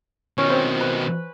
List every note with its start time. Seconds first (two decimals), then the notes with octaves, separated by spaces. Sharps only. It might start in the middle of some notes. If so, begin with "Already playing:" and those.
0.38 B2 D#3 C#4
0.50 C4
0.81 B4